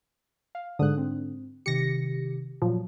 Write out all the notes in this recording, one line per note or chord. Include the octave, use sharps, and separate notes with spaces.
F5
G#2 D3 D#6 F#6
C4
C3 D#3 G4 A#6 C#7
A#2 F3 F#3